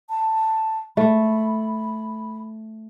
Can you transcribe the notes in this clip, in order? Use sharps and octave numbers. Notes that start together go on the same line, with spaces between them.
A5
A3 B5